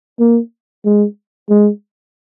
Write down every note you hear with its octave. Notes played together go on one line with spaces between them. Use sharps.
A#3
G#3
G#3